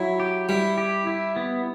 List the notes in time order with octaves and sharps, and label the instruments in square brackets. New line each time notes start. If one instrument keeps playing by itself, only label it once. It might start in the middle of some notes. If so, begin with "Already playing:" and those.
Already playing: [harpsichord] F#3 [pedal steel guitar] E4
[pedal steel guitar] G4
[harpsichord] G3 [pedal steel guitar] E4
[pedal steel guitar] G4
E4
B3